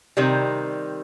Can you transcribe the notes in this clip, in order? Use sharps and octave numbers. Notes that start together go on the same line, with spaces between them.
C3 D#3 G3